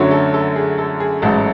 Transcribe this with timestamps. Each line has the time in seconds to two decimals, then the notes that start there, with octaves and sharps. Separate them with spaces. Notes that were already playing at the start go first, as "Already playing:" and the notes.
Already playing: F#2 D3 F#3 A3 C#5
0.11 A4
0.34 A4
0.56 G#4
0.78 A4
1.00 G#4
1.22 A1 G#2 F#3 A3 A4